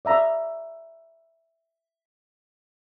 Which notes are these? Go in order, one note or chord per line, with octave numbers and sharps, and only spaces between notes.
D5 E5 A#5 D#6